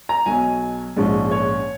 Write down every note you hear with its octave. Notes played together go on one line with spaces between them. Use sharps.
A#5
B1 B2 F#3 G#5
A#1 G#2 F3 G#3 C#4
C#5